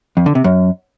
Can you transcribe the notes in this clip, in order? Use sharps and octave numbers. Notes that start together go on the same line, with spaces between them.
F2
D3
C3
F#2